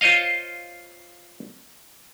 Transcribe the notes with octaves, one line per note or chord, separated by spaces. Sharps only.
F4 C5 C#5 D#5 F5